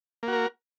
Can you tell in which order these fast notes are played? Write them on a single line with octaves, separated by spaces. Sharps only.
A#3 F#4 A#4